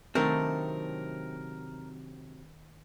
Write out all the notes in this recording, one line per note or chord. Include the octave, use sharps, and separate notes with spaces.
C3 D#3 F#3 A3 C4 D4 D#4 A#4